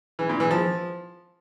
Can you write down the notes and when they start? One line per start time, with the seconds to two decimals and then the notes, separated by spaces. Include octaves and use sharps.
0.19 E3
0.29 A#2
0.40 E3
0.51 F3